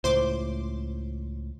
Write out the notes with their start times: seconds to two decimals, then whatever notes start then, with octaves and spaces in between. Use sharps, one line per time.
0.04 C#2 A2 C5 C6 D6